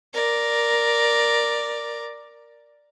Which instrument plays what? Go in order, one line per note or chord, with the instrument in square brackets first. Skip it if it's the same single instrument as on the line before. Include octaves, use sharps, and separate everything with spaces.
[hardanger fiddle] A#4 D5